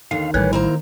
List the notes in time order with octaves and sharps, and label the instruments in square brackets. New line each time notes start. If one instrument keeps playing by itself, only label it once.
[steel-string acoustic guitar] D#2 D3 [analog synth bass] D#3 [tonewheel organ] F5
[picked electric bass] A#1 A2 G3 [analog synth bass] D#3 [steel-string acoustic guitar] E3 [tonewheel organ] B4 C#5
[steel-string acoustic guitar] A#3 C5 A#5 [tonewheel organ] E4